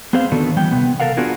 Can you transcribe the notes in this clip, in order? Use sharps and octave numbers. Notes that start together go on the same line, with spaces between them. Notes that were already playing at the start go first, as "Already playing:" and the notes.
B3 C4 G#4 C5 F5
D3 D#3 B3 D4 F#4 A4
E3 G3 B3 G5
C3 D#3 B3
A4 A#4 F5 F#5
B3 D4 F4 F#4 G#4 A#4